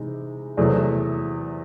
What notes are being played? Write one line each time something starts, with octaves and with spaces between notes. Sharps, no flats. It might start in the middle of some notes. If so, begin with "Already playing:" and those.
Already playing: C3 E3 G#3 D#4
E2 C3 F#3 A3